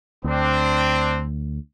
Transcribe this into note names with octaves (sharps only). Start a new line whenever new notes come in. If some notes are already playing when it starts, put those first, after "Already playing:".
D2 C4 D4